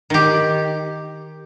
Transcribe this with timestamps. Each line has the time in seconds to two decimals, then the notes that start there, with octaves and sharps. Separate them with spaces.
0.10 D#3 G4